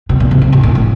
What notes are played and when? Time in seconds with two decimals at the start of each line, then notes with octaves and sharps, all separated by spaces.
0.09 B2
0.20 A#2
0.31 C3
0.42 C3
0.52 B2
0.63 A#2
0.75 A2